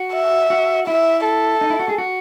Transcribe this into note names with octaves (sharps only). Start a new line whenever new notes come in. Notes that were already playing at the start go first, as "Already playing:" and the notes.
Already playing: F#4
E5
F#4
E4 E5
A4
D#4
E4
F#4
G#4
F#4